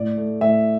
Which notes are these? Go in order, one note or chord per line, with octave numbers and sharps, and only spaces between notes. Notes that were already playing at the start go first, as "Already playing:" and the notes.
Already playing: A2 D5
A3
A2 E5